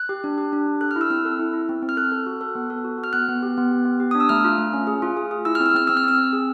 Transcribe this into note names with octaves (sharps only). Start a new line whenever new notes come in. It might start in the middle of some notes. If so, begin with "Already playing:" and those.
Already playing: F#6
G4
D4
G4
D4
G4
A4 F#6
F6
E4
E6
C4 F6
A4
E4
E4
C4
C4
F6
A4 F#6
A4
F#4
A4
B3
A4
F#4
F#4
F6
B3 F#6
B3
G4
B3
G4
B3
G4
D4 D#6
E6
A3 F6
F4
A3
C#4
G#4
F4
G#4
G#4
E4 E6
C4 F6
E6
C4 F6
C4 E6
F6
C4 E6
C4
G#4